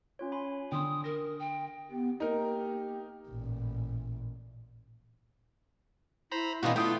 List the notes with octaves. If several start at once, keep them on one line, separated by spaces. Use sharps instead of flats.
C#4 F4 C#5
G#5 B5 C6
D3 G5 C6 D#6
A#4 A#6
G5
B3 G4
A#3 D#4 G4 A#4
A1 A#2
E4 C5 A#5 B5
B2 E3 B3 D4 D#4 F4 F#4 D#5
A3 B3 E4 F4 G5 D#6